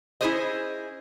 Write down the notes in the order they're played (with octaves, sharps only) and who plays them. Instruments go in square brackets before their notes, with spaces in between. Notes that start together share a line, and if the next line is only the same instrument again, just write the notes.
[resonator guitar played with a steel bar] C#4 E4 F4 G#4 C5 D#5